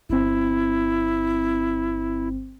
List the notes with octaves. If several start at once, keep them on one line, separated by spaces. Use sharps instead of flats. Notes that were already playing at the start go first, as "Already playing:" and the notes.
G1 C4 E4